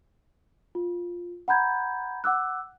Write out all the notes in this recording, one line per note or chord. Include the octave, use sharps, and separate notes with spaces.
F4
F#5 A#5 B5 G6 G#6
F#5 D6 E6 F#6